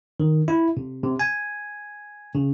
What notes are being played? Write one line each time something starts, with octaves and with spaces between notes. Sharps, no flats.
D#3
E4
C3
C3
G#5
C#3